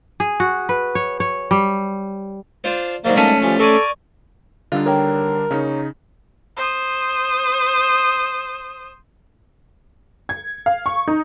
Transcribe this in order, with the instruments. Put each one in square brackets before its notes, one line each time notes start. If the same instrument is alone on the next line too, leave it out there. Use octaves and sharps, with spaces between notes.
[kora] G#4
F#4
B4
C#5
C#5
G3
[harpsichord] D4 F4 C5
[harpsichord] G#2 F#3 G3 [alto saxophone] A#3 [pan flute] C5
[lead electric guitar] A3 C#4 [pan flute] A5
[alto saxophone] F3 [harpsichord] G3 [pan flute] G#5
[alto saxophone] A4 [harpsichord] A#4 D5 G#5 [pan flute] C#6
[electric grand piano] D3 G3 D4 [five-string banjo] D#4 F4
[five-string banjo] D#3 A#3 C#5 [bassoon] A#4
[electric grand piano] C#3 D#4 [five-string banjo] A#3 C#4
[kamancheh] C5 D#6
[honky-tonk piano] G#6
F5
C#6
D#4